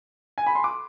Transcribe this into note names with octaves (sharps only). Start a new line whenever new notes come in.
G#5
B5
C6
D6